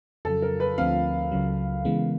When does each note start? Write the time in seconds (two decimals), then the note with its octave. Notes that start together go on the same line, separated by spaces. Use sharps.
0.25 F2 C#3 F#3 A4
0.42 A#4
0.60 B4
0.78 D2 D3 F3 A3 C4 F5
1.32 C#2 C#3 F#3
1.85 C#3 E3 G#3 B3